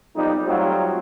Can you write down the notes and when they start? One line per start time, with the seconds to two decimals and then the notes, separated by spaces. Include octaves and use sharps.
0.16 B1 F2 G3 D#4
0.46 F#3 G3 A3 C4 D#4 F4